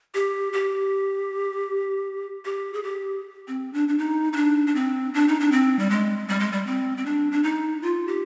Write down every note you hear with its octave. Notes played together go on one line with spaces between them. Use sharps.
G4
G4
G4
G#4
G4
C4
D4
D4
D#4
D#4
D4
D4
C4
D4
D#4
D4
C4
G3
G#3
G3
G#3
G3
C4
C4
D4
D4
D#4
F4
G4